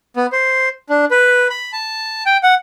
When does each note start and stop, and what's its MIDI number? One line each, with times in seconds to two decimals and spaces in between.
0.16 0.26 59
0.32 0.69 72
0.89 1.05 62
1.11 1.47 71
1.50 1.72 83
1.73 2.23 81
2.26 2.37 79
2.43 2.55 78